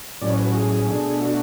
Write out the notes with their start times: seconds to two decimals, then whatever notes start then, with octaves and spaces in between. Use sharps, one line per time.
0.21 A2 F#3 C#4 D5
0.29 C#5
0.38 B4
0.46 F#4
0.55 G#4
0.87 B2 A3 D4
1.21 F#4